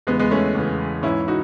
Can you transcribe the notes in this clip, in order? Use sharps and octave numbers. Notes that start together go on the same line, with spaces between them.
E2 C#3 E3 G#3 B3
G#3 B3
A3 C#4
E2 C#3 E3
G#2 E3 C#4 E4
D#4 F#4